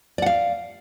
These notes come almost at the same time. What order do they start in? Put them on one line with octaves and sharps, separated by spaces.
D5 F#5 F5